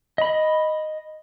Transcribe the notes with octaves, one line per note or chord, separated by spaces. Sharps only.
D#5 B5